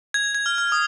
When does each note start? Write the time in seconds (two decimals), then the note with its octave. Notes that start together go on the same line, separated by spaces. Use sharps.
0.14 G#6
0.34 G#6
0.46 F6
0.58 F6
0.72 D#6